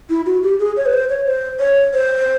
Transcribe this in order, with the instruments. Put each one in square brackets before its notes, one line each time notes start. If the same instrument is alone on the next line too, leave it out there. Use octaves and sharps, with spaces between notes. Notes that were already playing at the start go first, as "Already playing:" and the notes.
[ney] E4
F#4
G4
G#4
C#5
B4
C5
C#5
C5
C#5
C5